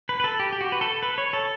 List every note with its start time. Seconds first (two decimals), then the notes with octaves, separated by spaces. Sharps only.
0.09 B4
0.20 B4
0.24 A4
0.40 G4
0.53 G4
0.61 F#4
0.72 B4
0.81 A4
1.03 B4
1.18 C#5
1.33 A4